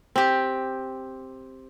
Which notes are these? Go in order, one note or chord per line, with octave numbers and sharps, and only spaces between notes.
C4 G4